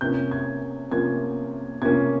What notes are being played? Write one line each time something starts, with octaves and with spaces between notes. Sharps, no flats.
C3 F3 A#3 C#4 G6
G#6
C3 F3 A#3 C#4 G#6
C3 F3 A#3 C#4 G#6